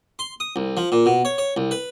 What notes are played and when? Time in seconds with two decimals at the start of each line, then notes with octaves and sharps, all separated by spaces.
0.19 C6
0.40 D#6
0.56 C2
0.77 F3
0.92 A#2
1.06 B2
1.25 C#5
1.38 C#5
1.57 C2
1.71 B4